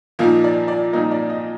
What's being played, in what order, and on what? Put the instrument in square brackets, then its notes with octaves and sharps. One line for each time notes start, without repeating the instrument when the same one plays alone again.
[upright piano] A#2 F3 A#3 D#4
D5
D5
A#2 F3 A#3 D#4 D#5
D5
D#5